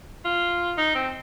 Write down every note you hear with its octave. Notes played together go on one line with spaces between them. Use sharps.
F4
D#4
C4